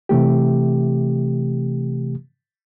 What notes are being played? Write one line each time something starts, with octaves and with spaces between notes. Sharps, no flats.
C3 E3 A3 G4